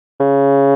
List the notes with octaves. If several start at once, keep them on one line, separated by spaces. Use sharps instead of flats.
C#3